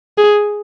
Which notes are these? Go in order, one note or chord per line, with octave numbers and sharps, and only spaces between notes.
G#4